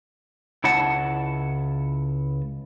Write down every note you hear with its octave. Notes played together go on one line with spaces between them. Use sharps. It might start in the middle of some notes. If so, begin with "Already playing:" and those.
C#2 E4 C#5 F#5 A5